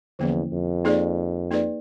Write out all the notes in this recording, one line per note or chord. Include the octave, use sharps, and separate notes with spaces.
E2 D3 F3 A#3 C#4 E4
F2
A#3 D#4 G#4 B4 D5
A#3 D#4 G#4 B4 D5